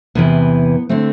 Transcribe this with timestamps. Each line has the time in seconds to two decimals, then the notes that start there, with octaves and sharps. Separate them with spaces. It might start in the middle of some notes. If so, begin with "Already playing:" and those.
0.15 E2 C3 E3 B3
0.89 D3 A3 C4